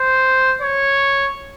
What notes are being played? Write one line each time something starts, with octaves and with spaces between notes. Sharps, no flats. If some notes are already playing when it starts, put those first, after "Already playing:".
Already playing: C5
C#5